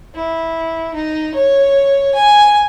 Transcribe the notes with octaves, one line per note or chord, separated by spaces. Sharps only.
E4
D#4
C#5
G#5